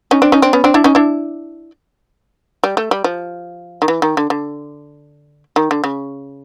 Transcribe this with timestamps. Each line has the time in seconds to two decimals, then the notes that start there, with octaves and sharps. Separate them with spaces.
0.11 C#4 D#4
0.22 C4 D4
0.32 C#4 D#4
0.42 C4 D4
0.53 B3 C#4
0.64 C4 D4
0.74 D4 E4
0.84 C#4 D#4
0.95 D4 E4
2.64 G3
2.77 A3
2.91 G3
3.04 F3
3.82 D#3
3.88 E3
4.02 D#3
4.17 D3
4.30 D3
5.56 D#3
5.71 D3
5.84 C#3